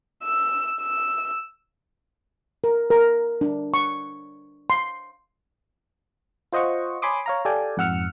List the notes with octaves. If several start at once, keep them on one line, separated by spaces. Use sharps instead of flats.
E6
E6
A#4
A#4
D4
C#6
C6
F4 C5 D#5 F#5 C#6
C#5 G#5 B5 C6 D6 D#6
C#5 F5 A#5
G4 A4 D5 F5 G5 G#5
F2 G#2 F#5 E6 F6 C#7